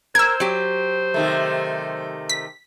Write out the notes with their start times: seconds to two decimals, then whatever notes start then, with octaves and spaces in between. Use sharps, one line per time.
0.15 A#4 C5 E6 G#6
0.40 F#3 G4
1.14 C3 D#3 A3
2.29 B6